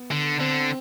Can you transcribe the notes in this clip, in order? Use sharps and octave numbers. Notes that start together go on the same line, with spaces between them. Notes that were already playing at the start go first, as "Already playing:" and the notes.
Already playing: B3
D3
D3 C4